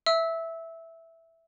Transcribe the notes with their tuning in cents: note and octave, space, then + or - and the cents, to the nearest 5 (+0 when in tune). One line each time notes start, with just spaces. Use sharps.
E5 +0 E6 -20